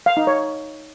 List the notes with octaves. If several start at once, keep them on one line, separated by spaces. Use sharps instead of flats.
F5
D#4
C#5